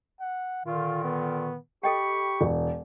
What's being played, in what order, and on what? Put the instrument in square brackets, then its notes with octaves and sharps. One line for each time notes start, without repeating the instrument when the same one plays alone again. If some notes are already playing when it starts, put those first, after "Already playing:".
[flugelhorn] F#5
[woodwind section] A#2 D3 D#3 [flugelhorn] F4
[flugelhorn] B3
[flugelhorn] G4 [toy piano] A4 D#5 G5 [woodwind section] B5 C#6
[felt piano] E1